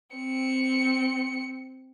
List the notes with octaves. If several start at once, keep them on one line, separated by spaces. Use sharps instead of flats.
C4 C#7